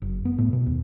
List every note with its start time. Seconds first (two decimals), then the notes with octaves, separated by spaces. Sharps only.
0.02 F#1
0.25 B3
0.38 A2
0.53 B2
0.66 D#2